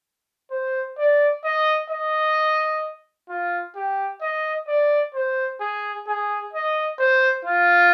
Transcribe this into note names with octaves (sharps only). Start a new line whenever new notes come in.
C5
D5
D#5
D#5
F4
G4
D#5
D5
C5
G#4
G#4
D#5
C5
F4